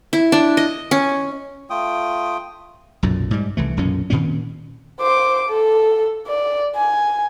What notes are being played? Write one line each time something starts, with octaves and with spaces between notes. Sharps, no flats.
E4
D4
D#5
C#4
A3 F4 G5 D#6
B1 F#2 A#2
G#2 G3
C2 E3 A3
B1 F#2 A#2 C#4
A#2 D#3 C4 C#4
C5 D6
A4
D5
G#5